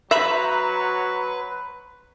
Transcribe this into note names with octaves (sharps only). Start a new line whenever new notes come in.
F#3 B4 C5 E5 A#5 B5